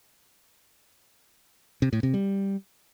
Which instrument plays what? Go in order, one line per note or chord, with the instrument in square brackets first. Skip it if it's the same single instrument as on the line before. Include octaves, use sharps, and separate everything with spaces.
[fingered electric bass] C3
A2
C3
G3